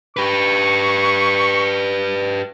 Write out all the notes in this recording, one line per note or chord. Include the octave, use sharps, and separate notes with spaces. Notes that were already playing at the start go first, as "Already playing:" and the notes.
G4 B4 C#6